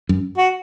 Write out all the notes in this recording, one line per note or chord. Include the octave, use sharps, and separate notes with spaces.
F#2
F#4